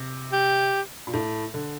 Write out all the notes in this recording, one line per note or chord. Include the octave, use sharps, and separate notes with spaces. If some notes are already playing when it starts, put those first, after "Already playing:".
Already playing: C3
G4
A#2
A2
D3